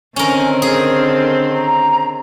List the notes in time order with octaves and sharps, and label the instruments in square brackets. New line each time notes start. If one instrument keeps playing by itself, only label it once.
[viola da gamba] D3 D#3 C4 [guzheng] C#4 A#4 [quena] G#5
[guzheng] G#4 [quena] A#4
[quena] A#5